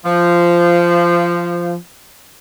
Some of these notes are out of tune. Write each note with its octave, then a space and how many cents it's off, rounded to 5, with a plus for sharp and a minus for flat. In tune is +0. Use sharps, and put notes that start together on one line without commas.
F3 -15